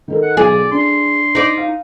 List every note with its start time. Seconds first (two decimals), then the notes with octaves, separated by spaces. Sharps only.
0.08 D#3 A4 A#4
0.23 F#5
0.37 B1 G#4 D5
0.71 D4 C6
1.35 D#4 D5
1.57 F5